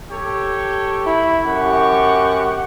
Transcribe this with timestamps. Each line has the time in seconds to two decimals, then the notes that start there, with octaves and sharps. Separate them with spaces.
0.11 G4 A4 C#5
1.06 E4
1.46 F#2 G4 F#5 C#6